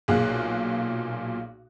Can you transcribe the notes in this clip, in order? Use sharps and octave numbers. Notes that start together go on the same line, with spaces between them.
B1 A#2 G#4 F5 F#6